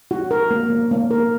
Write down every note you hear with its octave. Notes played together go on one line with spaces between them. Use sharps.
F#4
A#4
A#3
A#3
A#3
A#4